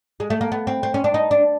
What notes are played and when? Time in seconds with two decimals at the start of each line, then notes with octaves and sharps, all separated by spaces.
0.20 G#3
0.30 A3
0.41 A#3
0.52 B3
0.67 C4
0.83 C4
0.94 C#4
1.04 D4
1.14 D#4
1.31 D4